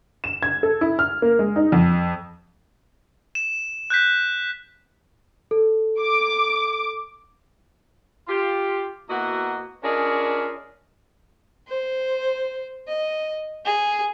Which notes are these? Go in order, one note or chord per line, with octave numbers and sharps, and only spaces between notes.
E7
G#6
A4
E4
F6
A#3
G#3
D#4
F2
E7
F#6 G6 B6
A4
D6
F4 G4
B2 A#3 E4 F#4 D#5 F#5
C#4 D4 F4 G#4 A#4 D#5
C5
D#5
G#4